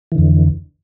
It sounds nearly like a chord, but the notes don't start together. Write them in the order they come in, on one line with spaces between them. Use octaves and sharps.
E3 D3 F2